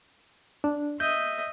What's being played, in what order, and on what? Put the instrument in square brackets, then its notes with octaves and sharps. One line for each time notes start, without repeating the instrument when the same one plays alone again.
[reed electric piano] D4
[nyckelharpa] D#5 E5 [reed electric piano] G6